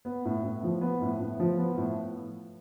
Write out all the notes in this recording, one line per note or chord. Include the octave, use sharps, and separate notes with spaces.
B3
A2
A2
F3
B3
A2
A2
F3
B3
A2